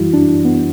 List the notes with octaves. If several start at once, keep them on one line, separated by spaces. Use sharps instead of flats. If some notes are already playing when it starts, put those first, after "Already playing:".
Already playing: F#2 E3 G3 E4 F#4
D4
B3